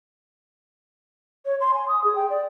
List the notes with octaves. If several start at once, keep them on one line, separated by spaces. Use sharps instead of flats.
C#5
C6
G#5
D#6
G#4
G5
D5